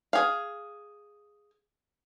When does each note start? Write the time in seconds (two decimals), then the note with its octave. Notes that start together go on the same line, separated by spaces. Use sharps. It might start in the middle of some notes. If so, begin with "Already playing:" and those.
0.13 G#4 F5